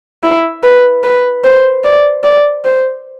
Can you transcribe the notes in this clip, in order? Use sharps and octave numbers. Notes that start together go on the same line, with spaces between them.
E4
B4
B4
C5
D5
D5
C5